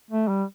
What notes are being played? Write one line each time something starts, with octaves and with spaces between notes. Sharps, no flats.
A3
G3